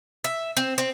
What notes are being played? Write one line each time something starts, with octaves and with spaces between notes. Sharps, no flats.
E5
C4
C4